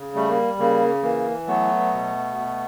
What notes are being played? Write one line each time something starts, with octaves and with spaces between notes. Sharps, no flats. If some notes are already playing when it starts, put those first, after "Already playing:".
Already playing: C#3
G3 A3
A#3
C#3 A#3
E3 A#3
F#3 A3 B3
B2
B2